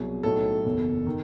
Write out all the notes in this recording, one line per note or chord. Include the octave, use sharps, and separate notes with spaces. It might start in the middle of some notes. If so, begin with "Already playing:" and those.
Already playing: C2 B2 F#3 G#4
B1 A2 F#3 A4
F#1 E2 B2
D#3